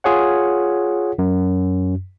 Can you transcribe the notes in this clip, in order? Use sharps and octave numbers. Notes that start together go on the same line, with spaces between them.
F4 G#4 C#5 F#5
F#2